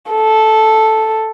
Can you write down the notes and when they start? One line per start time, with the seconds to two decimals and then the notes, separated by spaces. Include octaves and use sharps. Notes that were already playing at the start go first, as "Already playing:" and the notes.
0.11 A4